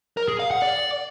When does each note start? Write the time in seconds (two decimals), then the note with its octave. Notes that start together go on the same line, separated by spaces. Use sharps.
0.17 A#4
0.28 G#4
0.40 F5
0.51 F#5
0.62 D5